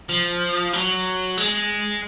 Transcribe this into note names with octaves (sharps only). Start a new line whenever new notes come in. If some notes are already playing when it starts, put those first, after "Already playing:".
F3
F#3
G#3